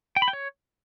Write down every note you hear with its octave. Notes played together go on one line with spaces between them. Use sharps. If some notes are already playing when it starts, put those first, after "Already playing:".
G5
B5
G5
C#5